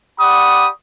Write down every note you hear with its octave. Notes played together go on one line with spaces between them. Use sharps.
G4 D5 F#5 B5 C#6 D#6